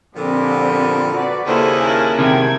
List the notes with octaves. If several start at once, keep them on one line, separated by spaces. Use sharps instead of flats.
A#2 D3 F3 G3 C4
F#4 B4 D5
D#2 C#3 G3 A#3 E4 G#4 A4 C5
A#4 G#5 A5
C3 D#3 G#6